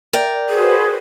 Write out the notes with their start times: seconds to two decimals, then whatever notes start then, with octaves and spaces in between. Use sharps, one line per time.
0.13 A#4 D5 G5
0.50 F#4 G#4 B4 C5